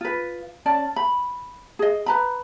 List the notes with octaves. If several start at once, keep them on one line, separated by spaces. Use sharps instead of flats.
F4 B4
C#4 D5 A5
B5
G#4 D#5
B4 A#5 B5